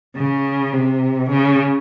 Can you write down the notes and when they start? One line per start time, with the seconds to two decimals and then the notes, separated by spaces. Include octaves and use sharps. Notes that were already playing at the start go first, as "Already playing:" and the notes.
0.18 C#3
0.73 C3
1.30 C#3